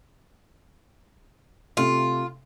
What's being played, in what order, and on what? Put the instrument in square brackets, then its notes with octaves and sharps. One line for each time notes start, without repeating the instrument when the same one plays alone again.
[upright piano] C3 A3 [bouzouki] F4